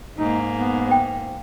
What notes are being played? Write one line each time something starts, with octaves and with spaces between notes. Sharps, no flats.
G#2 A#3 D#4
B3
C5 F5 G5